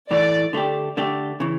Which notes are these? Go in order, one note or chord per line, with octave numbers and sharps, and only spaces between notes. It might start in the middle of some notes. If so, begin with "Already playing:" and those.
A2 E3 A3 D5
D3 A3 D4 G4
D3 A3 D4 G4
C#3 E3